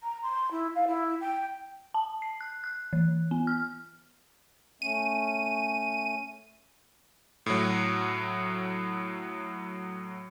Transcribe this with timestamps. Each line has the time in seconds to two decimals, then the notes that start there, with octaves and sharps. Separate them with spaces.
0.03 A#5
0.22 C6
0.51 E4
0.75 F5
0.87 E4
1.21 G5
1.94 A5
2.22 C7
2.41 F#6
2.64 F#6
2.93 E3
3.31 B3
3.47 F6
4.82 A3 C#4 D#7
7.46 A2 F#3